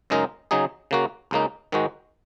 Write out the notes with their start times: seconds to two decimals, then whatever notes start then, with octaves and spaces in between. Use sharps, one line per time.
0.10 F#2 C#3 G#3 D#4 A#4
0.51 C#3 F#3 D#4 G#4
0.91 C#3 A#3 F#4
1.31 C#2 C#3 A#3 D#4
1.72 G#2 D#3 G#3 F#4